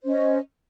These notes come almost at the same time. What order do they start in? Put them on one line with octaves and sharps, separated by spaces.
C5 C#4 D#5